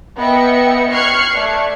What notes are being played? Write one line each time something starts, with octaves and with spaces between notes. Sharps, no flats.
B3 B4 D#5 E5 G5 C#7
C#6 F6 F#6 G#6 C7 C#7
A3 D5